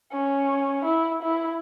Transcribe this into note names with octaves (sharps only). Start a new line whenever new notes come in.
C#4
E4
E4